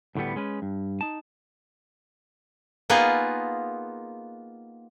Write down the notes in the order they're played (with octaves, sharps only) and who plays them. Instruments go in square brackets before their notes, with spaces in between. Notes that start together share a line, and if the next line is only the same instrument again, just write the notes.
[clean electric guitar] D2 A2 D3 G3 B3
G#3 C#4 B4
G2
D#4 A5
[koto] A#3 B3 D#4 F4 G#4 D#5